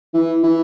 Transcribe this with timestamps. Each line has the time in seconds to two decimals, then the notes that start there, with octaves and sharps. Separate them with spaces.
0.14 E3
0.43 E3